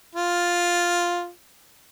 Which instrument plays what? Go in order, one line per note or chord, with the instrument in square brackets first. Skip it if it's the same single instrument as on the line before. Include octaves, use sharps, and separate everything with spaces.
[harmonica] F4